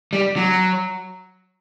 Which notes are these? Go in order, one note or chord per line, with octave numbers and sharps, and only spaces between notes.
G3
F#3